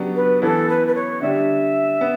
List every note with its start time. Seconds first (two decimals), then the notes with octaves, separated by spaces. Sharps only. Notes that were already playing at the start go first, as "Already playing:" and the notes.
Already playing: C#3 F#3 B3 D4 G4
0.15 B4
0.42 E3 B3 E4 A4
0.69 B4
0.87 B4
0.95 C#5
1.21 D3 G3 D4 G4 E5
2.01 B3